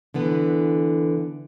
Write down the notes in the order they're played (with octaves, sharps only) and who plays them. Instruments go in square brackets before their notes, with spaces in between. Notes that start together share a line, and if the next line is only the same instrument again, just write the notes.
[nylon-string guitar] D3 E3 B3